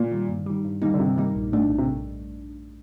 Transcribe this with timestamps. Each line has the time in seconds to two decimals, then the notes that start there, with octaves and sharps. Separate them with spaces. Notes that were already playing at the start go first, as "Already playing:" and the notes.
Already playing: A#2
0.12 D#3 G3
0.29 G2
0.46 D#3 G3
0.65 G2
0.82 D#3 G3 A#3 D#4
0.94 D3
0.99 G2 C3
1.16 D#3 G3 A#3 D#4
1.35 A#1
1.52 A2 A3 D4
1.69 A#1
1.78 C3